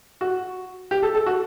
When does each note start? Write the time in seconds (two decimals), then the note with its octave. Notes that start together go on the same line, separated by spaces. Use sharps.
0.21 F#4
0.91 G4
1.03 A4
1.15 A4
1.26 F#4